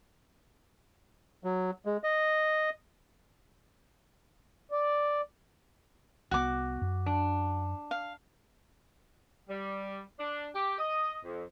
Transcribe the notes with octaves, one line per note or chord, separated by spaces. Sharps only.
F#3
G#3
D#5
D5
C2 F3 B3 F#4 D6
F#2
D4
F5
G3
D4
G4
D#5
F2